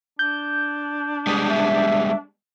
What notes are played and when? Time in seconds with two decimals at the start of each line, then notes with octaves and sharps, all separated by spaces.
0.19 D4 G6
1.27 G3 G#3 B3 D#6
1.49 E5